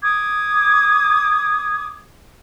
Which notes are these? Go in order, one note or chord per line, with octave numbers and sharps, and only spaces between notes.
D6 D#6 G#6